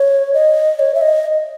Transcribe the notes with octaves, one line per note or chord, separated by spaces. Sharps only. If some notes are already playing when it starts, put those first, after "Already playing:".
Already playing: C#5
D#5
C#5
E5
D#5